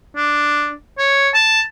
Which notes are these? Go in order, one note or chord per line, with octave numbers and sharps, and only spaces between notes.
D4
C#5
A5